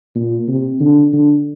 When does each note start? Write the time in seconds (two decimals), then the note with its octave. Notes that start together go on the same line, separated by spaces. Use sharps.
0.15 A#2
0.48 C3
0.80 D3
1.13 D3